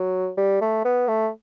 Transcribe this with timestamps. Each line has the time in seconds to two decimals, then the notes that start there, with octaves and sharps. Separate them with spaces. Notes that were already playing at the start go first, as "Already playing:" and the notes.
Already playing: F#3
0.38 G3
0.61 A3
0.85 B3
1.08 A3